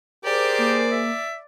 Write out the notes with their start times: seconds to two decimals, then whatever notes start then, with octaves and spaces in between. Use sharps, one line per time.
0.24 G4 G#4 A#4 C5 D5
0.58 A#3
0.91 E5